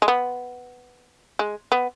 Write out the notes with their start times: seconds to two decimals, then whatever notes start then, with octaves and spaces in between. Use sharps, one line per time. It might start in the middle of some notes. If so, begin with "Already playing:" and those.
0.02 G#3
0.08 B3
1.39 G#3
1.72 B3